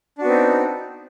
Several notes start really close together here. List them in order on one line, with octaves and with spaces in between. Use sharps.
D4 F#4 B3 C4 D#4